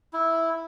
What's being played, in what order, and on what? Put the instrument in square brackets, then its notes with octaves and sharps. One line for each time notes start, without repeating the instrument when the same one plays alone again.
[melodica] E4